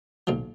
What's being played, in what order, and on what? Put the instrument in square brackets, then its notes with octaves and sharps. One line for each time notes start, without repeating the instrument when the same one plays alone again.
[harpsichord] B1 A#2 F3